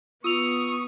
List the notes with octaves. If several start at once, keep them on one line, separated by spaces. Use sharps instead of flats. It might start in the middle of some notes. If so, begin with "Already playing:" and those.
B3 F4 C#6 D#6 E6 F7